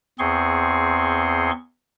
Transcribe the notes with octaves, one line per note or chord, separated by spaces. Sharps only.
E2 C4 G#4 C6 C#6